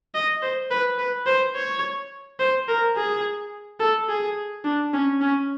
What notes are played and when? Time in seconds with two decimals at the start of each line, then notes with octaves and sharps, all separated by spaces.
0.15 D#5
0.42 C5
0.71 B4
0.98 B4
1.27 C5
1.56 C#5
2.40 C5
2.68 A#4
2.96 G#4
3.80 A4
4.09 G#4
4.64 D4
4.93 C#4
5.21 C#4